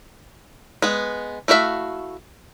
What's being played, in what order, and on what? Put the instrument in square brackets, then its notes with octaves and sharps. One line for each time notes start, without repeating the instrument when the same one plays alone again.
[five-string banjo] G#3 B3
A3 E4 F#4 E5 F5